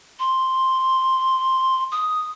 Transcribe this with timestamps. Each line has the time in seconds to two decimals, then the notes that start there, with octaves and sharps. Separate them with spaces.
0.20 C6
1.92 D#6